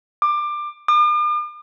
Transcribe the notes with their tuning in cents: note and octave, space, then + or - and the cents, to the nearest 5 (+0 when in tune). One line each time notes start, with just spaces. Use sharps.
D6 +20
D6 +45